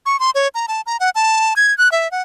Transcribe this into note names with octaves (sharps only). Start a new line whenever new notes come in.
C#6
C6
C#5
A#5
A5
A#5
F#5
A5
G#6
F#6
E5
F#5